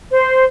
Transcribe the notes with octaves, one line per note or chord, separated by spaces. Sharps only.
C5